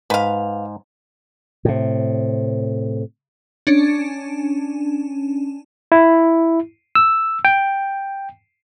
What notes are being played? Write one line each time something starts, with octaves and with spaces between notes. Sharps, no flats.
G#2 B4 F5
A2 C3
C#4 D4
E4
E6
G5